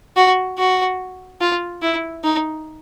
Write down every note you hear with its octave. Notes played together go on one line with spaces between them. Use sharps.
F#4
F#4
F4
E4
D#4